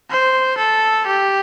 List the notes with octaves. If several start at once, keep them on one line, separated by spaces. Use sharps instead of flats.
C5
A4
G4